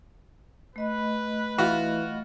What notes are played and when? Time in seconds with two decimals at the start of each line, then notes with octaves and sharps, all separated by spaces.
0.76 A3 B4 D#5 B5
1.58 E3 F4 F#4